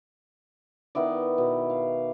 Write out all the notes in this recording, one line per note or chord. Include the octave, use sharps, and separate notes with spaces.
D#3 B3 E4 D5
B2
F5